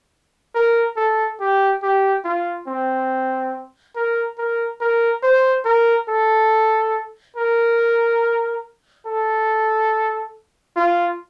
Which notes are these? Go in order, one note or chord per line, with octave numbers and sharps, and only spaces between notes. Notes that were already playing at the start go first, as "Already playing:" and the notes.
A#4
A4
G4
G4
F4
C4
A#4
A#4
A#4
C5
A#4
A4
A#4
A4
F4